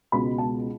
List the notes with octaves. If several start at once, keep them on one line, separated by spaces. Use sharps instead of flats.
C#2 B2 G#3 B3 B5
A5